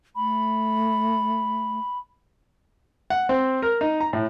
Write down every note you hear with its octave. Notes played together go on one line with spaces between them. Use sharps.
A3 B5
F#5
C4
A#4
D#4
A#5
A2